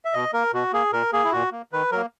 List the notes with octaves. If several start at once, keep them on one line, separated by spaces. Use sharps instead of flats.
E5
B2 D#5
A#3 A#4
B2 F#4
A#3 G#4
A#2 A#4
A#3 G#4
E4
A#2 F#4
A#3
D#3 B4
F#3 A#3 A#4